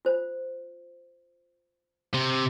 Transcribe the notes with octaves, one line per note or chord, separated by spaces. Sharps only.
F4 C5
C3